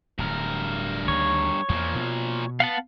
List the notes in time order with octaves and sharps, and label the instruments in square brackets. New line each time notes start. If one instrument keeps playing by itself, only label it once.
[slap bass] D1 D2 [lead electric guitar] G2 A#4
[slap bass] D2 D#3 A#3 [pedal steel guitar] C#5
[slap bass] E2 [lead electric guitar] A#2 F3
[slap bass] B2
[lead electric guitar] B3 [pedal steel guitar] F5 F#5 A5